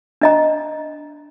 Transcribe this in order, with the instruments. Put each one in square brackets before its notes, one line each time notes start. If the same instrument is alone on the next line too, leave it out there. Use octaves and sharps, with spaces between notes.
[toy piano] D4 D#5 A#5